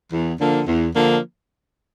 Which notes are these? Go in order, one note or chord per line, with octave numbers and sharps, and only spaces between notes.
E2
D3 F3 A#3 D4
E2
D3 F3 A#3 D4